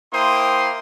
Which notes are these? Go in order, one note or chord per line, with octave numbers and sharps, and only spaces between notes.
A#3 E4 C5 G5 C6 D#6